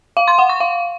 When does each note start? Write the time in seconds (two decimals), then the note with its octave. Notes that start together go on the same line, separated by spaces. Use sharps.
0.17 F5
0.28 C6
0.39 F#5
0.49 C#6
0.60 F5